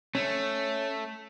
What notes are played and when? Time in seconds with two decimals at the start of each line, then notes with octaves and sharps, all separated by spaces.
0.15 A3 C#4